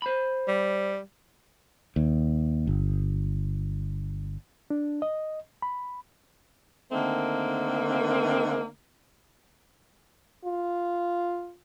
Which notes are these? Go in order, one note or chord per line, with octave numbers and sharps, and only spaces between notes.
C5 B5
G3
D#2
G1
D4
D#5
B5
D3 D#3 A3 A#3 C4
F4